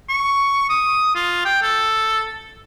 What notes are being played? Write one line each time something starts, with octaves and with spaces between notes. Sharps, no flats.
C#6
D#6
F4
G5
A4